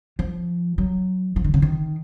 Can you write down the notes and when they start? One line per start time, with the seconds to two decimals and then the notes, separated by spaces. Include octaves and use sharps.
0.19 F3
0.78 F#3
1.36 F3
1.44 D#3
1.54 C#3
1.62 D#3